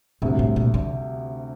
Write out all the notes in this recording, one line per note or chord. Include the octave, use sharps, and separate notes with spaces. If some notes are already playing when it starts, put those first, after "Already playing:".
D2 G2 C3 G3
A2
A#2
D3